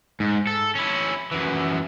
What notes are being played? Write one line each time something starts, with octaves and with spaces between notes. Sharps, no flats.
G#2
A4
C#4 E4
F#2 E3